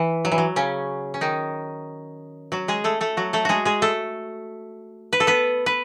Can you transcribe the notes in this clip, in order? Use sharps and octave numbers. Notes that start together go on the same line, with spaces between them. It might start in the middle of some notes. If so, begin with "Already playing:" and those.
Already playing: E3
F#3
E3
F#3
C#3 C#4
C#4
D#3 D#4
F#3 F#4
G#3 G#4
A3 A4
A3 A4
F#3 F#4
A3 A4
G#3 F#4 G#4
G#3 G#4
A3 A4
B4
A4
B3 B4
B4